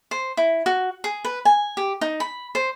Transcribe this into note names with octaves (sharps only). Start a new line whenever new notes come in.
C5
E4
F#4
G#4
B4
G#5
G4
D#4
B5
C5